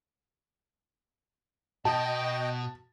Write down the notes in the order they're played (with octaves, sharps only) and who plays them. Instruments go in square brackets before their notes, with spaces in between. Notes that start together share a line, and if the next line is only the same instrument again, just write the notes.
[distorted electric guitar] B2 [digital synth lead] F#4 [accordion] D#5 G5 [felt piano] A5